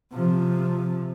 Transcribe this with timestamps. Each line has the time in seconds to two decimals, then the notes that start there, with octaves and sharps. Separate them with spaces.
0.13 C3 F3